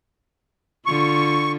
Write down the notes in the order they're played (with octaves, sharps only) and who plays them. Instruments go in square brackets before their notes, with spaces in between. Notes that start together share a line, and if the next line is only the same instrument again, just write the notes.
[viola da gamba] D3 F4 [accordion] C#6